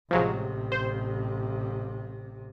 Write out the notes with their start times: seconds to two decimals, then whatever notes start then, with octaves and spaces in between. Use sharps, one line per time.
0.11 A1 C3 F3 F#3 G#3
0.72 C5